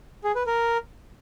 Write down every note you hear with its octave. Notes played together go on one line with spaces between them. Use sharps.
G#4
B4
A#4